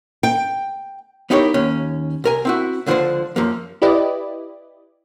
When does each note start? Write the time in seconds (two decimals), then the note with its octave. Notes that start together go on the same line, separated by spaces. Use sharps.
0.23 G5
1.30 B3 D#4 E4 G4 A#4 C#5
1.54 D#2 C#4
2.24 C2 A#4 G#5
2.45 C4 E4 F#4
2.86 C#2 D3 F3 G#3 D4 C5
3.36 F#2 F3 A#3
3.82 E4 G4 B4 D5 D#5